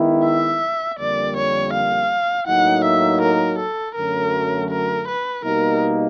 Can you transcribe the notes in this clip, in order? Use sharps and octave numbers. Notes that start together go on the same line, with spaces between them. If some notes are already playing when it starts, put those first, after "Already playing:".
Already playing: D#3 G#3 B3 E4
E5
F2 D3 G3 A#3 D5
C#5
F5
A2 F#3 A#3 D#4 F#5
E5
A#4
A4
F#2 D3 F#3 A3 C#4 A#4
A#4
B4
B2 G3 A#3 D#4 A#4